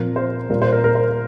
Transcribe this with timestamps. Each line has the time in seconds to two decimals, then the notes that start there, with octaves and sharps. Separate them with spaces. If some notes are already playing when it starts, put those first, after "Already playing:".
Already playing: A#2 F3 C4 A#4
0.16 C5
0.49 A#2 G3 A#3 A#4
0.62 C5
0.73 A#4
0.84 A#4
0.95 C5